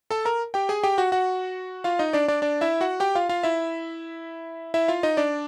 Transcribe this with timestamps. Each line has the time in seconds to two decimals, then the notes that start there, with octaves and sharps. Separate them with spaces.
0.11 A4 A5
0.25 A#4 A#5
0.54 G4 G5
0.69 G#4 G#5
0.84 G4 G5
0.98 F#4 F#5
1.12 F#4 F#5
1.84 F4 F5
1.99 D#4 D#5
2.13 D4 D5
2.28 D4 D5
2.42 D4 D5
2.61 E4 E5
2.81 F#4 F#5
3.00 G4 G5
3.15 F4 F5
3.29 F4 F5
3.43 E4 E5
4.74 E4 E5
4.88 F4 F5
5.03 D#4 D#5
5.17 D4 D5